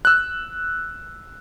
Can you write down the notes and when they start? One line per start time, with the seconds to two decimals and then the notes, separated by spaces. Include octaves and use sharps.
0.05 E6 F#6